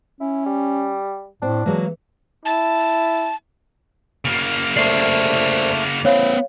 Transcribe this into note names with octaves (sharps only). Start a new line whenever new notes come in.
C#4 E4
G3
A2 C4 D4
E3 F#3 G#3 A#3
E4 A5
C#3 A#3
A3 C5 D5 C7
B3 E4 C5 C#5 F5